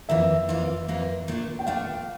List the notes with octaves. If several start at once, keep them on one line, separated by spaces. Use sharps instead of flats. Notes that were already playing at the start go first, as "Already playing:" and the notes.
F2 E3 A#3 F4 E5
F2 E3 A#3 F4
F2 E3 A#3 F4
A#2 A3 D4
G5
A#2 A3 D4 F5